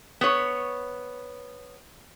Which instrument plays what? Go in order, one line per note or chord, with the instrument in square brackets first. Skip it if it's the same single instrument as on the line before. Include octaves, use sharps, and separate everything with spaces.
[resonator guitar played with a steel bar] B3 C#5